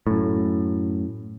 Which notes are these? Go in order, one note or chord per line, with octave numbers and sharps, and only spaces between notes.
F#2 A2